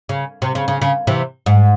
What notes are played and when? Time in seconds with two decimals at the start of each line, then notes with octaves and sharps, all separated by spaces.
0.09 C#3
0.42 C3
0.55 C#3
0.68 C#3
0.82 C#3
1.07 C3 E3
1.46 G#2